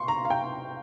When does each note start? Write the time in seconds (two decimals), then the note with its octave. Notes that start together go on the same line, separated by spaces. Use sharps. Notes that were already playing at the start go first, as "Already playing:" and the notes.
Already playing: C6 C#6
0.08 A#5
0.25 F5
0.30 G5